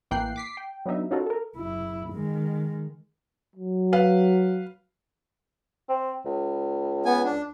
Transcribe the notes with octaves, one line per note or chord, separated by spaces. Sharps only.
A1 E3 A#3 G5 F#6 C7
D6 B6 C7
G5
F#3 B3 D4 D#4 E5
C#4 D#4 F4 F#4 A4 A#4
A4 A#4
F#1 E4
D#3 G#3
F#3
B4 F5
C4
C#2
B3 G#5
D4